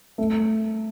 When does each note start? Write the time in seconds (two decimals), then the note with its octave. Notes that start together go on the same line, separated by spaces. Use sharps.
0.18 A3